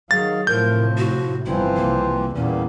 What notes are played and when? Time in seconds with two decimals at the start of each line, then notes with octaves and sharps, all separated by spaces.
0.11 D#3 F#3 G#4 F5 A6
0.47 A2 C3 F3 A#4 G6
0.98 F#4
1.46 G1 E3 F3 C4 E4
1.77 C2 A#3
2.35 E2 A#2 G3 A#3 B3 C#4